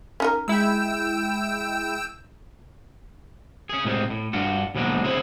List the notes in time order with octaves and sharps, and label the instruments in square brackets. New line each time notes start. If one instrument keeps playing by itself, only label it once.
[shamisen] C#4 D#4 A#4
[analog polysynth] G#3 E4 [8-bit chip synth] G5 E6
[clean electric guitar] C#4 G#4
A2 C3 G#3 C4
A2
G2 D4 F4 F#4
D#2 B2 F3 F#3 G#3 D4
D2 C4 E4 G#4 C5 C#5